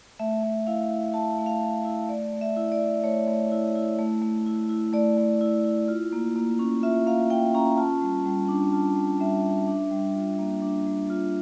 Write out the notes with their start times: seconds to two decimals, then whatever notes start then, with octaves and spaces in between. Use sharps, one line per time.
0.19 A3 E5
0.43 A3
0.67 E4 F5
0.90 E4
1.14 A3 A5
1.38 A3
1.46 F5
1.62 E4
1.85 E4
2.09 A3 D5
2.33 A3
2.41 E5
2.56 E4
2.72 D5
2.81 E4
3.03 A3 C#5
3.28 A3
3.52 E4
3.75 E4
3.99 A3
4.22 A3
4.46 E4
4.69 E4
4.93 A3 D5
5.18 A3
5.41 E4
5.65 E4
5.88 F4
6.12 A#3
6.36 A#3
6.59 C#4
6.83 F4 E5
7.07 A#3 F5
7.30 A#3 G5
7.54 C#4 A#5
7.77 F4 A5
8.02 G3
8.26 G3
8.49 D4
8.72 F4 A5
8.96 G3
9.20 G3 E5
9.44 D4
9.68 D4
9.91 G3
10.15 F4
10.39 A#3
10.62 D4
10.86 G3
11.10 F4